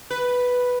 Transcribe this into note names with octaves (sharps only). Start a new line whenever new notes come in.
B4